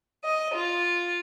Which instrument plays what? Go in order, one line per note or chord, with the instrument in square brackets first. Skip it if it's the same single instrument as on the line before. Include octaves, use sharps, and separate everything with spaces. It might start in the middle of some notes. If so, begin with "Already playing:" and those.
[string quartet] D#5
F4